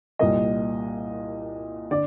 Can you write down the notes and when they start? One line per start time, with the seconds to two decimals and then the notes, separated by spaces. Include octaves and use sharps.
0.19 C2 A#2 G3 A#3 D#5
1.91 D3 D5